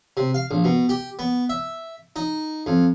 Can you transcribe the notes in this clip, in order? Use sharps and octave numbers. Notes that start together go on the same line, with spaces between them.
C3
F5
A#1
B2
G4
B3
E5
D#4
F2